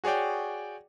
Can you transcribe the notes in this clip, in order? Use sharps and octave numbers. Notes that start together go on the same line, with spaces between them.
F#4 G#4 C#5 D5 G5